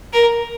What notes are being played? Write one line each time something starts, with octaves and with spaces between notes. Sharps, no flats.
A#4